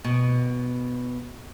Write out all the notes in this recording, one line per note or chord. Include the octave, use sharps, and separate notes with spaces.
B2